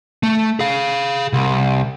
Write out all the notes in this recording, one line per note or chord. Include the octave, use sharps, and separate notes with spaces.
A3
G#4 F5
C2